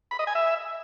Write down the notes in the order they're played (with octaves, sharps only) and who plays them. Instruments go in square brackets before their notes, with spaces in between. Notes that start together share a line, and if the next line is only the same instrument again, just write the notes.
[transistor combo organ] B5
D#5
G#5
E5